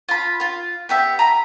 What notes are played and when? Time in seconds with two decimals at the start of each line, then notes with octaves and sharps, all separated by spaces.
0.09 F4 B5
0.40 F4 F5
0.89 B3 G4 E5
1.19 A#5 B5